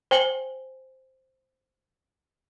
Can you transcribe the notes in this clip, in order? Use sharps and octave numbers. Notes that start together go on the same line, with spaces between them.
C5 G5 G#5 F#7 G7